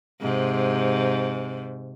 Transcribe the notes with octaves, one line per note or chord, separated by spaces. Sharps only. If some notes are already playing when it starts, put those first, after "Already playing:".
G#2 C3